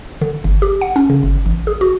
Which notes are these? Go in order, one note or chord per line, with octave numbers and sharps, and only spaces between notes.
D3
G1
G4
F#5
C#4
C#3
G1
A1
G#4
F#4